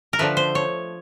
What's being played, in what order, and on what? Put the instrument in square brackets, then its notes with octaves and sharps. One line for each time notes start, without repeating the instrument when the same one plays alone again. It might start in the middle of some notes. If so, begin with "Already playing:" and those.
[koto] A#4
D3 F3 A3 B4
C5
C#5